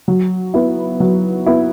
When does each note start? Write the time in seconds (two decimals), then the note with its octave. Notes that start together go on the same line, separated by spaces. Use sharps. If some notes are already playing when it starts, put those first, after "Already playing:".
0.08 F#3
0.54 B3 E4
1.00 F#3
1.46 B3 E4